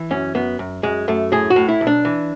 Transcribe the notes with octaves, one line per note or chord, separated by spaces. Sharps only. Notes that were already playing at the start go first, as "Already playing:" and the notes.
Already playing: E3
F#2 C#4
F#2 B3
F#2
F#2 G#3
F#2 A3
A2 G#4
F#4
A2
E4
B1
D4
E3